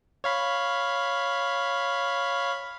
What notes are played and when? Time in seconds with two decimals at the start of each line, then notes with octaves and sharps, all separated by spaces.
0.24 C#5 F5 B5